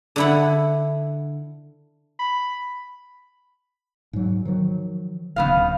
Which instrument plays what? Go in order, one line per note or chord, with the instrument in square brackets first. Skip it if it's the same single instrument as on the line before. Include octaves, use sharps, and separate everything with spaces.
[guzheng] D3 E4 F#5
[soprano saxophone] B5
[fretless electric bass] G#2 F#3
D#3 F3 F#3
[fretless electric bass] D1 D#2 [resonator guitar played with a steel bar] C#3 B3 F5